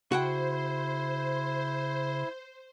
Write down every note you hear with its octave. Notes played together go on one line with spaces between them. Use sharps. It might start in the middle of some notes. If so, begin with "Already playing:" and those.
C#3 E4 F#4 C5 F#5 G5